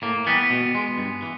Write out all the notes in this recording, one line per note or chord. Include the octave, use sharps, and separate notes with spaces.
A2 A#3
E3 G3 B3
B2
G#3
G2
E3